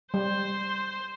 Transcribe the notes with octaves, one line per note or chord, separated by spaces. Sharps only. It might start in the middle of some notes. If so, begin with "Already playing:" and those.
G3 C5